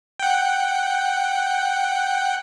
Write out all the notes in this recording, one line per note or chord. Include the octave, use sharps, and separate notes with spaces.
F#5 G5